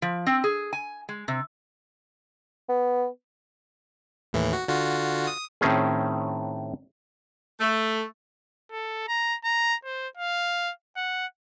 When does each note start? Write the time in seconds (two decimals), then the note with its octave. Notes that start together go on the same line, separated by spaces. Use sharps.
0.02 F3
0.27 C4
0.44 G#4
0.73 G#5
1.09 G#3
1.28 C3
2.69 B3
4.33 D#2 A2 E3
4.53 F#4
4.68 D3 F4 F#4
5.27 D#6
5.61 A2 D#3 C4 C#4 G#4
7.60 A3
8.72 A4
9.08 A#5
9.44 A#5
9.85 C5
10.17 F5
10.97 F#5